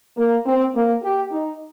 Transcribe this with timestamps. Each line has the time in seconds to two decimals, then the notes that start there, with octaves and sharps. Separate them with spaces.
0.17 A#3
0.46 C4
0.75 A#3
1.03 G4
1.32 D#4